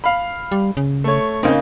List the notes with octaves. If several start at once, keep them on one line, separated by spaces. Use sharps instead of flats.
F5 B5
G3
C#3
A3 C#5
C#3 A#3 C4 D#4